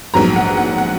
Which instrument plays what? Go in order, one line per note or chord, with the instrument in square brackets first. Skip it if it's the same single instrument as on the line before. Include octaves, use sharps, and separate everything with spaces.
[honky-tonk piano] A#1 G#2 F#3 B3 A#5
F#5
F#5
F#5